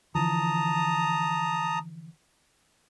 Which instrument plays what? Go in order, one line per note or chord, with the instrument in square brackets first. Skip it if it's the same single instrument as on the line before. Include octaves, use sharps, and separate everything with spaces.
[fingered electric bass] D3 E3 F3 [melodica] A5 A#5 D#6